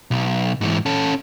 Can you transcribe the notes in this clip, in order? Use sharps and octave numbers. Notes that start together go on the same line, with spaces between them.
B1
G#2 E3
C#4 A4